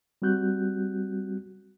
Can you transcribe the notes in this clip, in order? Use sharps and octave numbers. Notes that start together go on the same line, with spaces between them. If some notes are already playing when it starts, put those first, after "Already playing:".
G3 C4 F#4 F#6 G6